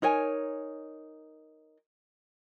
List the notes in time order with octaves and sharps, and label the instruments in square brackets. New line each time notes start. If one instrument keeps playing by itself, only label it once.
[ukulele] D#4 A#4 C#5 G#5